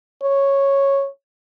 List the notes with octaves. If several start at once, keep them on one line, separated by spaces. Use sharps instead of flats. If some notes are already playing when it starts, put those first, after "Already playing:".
C#5